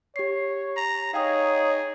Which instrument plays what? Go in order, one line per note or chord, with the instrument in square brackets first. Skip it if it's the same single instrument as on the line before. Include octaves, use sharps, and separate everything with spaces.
[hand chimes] G4 C7 [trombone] C#5
[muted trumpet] A#5
[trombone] D#4 [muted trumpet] G#4 [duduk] C#5 [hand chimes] F5 G5 D#6